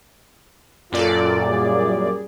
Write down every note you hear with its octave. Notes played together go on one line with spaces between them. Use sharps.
F#2 A#2 F4 A4 D5
G3 G#4